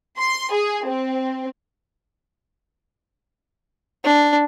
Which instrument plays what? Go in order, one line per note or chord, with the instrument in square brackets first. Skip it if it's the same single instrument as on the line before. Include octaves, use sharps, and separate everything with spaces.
[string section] C6
G#4
C4
[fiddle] D4